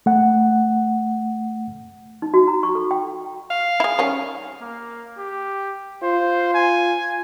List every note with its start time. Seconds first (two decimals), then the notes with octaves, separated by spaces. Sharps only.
0.06 A3 F#5
2.22 D#4
2.34 F#4
2.48 A#5
2.63 C#6
2.75 A4
2.91 G5
3.50 F5
3.80 E4 G#4
3.99 D#3 G3 C#4
4.61 A#3
5.18 G4
6.03 F4 C5
6.54 G#5